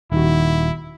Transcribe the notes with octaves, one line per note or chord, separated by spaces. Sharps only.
D#1 D#3 E4 F#4